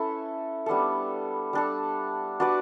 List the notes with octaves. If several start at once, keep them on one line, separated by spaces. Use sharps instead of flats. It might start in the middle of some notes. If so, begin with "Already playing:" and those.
Already playing: C#4 E4 A4 B4
G3 B3 D4 A4
G3 D4 A4
D4 F#4 B4 D5